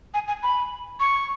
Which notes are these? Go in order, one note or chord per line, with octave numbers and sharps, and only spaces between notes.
G#5
G#5
B5
C#6